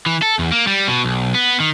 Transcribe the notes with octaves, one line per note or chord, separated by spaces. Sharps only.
E3
A4
E2
A#3
G3
B2
B1
B3
D#3